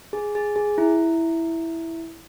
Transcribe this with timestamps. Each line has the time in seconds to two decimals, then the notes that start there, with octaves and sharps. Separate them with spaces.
0.13 G#4
0.35 G#4
0.56 G#4
0.78 E4